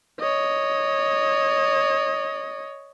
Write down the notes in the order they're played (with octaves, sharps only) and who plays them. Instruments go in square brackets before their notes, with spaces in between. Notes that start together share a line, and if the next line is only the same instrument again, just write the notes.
[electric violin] C#5 D#5